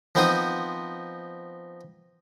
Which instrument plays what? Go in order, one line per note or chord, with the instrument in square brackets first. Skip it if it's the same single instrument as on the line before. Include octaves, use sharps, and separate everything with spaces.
[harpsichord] F3 B3 C4 D#4 C5 D#6